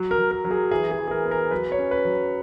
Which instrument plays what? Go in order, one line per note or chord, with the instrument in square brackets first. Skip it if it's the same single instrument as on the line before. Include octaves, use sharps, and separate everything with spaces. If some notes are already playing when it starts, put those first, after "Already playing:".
Already playing: [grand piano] F#3
A#4
F#3
A#4
F#3
G#4
E3 G#4
G#4
E3
G#4
A#4
B3
A#4
F#3 B4
C#5
C#4
B4
F#3